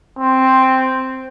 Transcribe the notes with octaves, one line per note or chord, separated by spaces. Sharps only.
C4